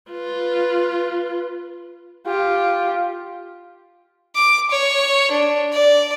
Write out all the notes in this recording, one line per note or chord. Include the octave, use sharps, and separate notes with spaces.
F4 B4
F4 G4
D6
C#5
D4
D5